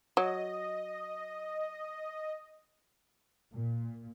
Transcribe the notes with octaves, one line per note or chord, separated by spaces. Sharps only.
F#3 D#5
A#2